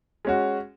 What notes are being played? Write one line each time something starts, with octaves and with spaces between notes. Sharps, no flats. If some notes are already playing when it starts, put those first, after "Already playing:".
G#3 C#4 F#4